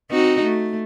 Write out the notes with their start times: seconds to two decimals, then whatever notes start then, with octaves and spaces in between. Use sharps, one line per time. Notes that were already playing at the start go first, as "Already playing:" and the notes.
0.11 C4 D#4 F#4
0.43 A3